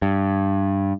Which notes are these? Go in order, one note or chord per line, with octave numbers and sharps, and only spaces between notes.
G2